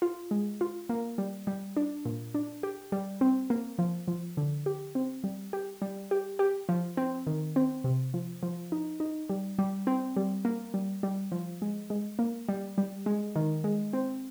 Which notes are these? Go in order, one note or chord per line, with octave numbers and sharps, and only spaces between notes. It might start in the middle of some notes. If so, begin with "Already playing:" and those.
F4
G#3
F4
A#3
G3
G3
D4
A#2
D4
G4
G3
C4
A#3
F3
F3
D3
G4
C4
G3
G4
G3
G4
G4
F3
C4
D#3
C4
C3
F3
F3
D#4
D#4
G3
G3
C4
G3
A#3
G3
G3
F3
G#3
G#3
A#3
G3
G3
G#3
D#3
G#3
C4